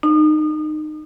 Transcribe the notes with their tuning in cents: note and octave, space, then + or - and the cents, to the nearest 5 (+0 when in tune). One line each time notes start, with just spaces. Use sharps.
D#4 -25